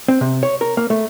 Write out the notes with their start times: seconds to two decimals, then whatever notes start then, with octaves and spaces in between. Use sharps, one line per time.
0.08 C4
0.21 C3
0.43 C#5
0.61 A#4
0.77 A#3
0.90 A3